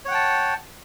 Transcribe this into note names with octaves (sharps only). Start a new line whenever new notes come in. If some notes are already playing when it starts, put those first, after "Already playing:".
C#5 F#5 G5 A5